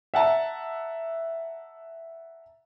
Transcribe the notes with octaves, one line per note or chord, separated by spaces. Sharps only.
E5 F#5 A5 A#5